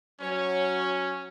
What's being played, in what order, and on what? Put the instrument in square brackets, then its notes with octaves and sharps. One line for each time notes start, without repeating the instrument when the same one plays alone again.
[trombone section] F#3 [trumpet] C#4 [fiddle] C#5